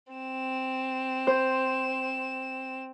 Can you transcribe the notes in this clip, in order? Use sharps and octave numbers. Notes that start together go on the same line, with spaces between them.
C4 E7
C5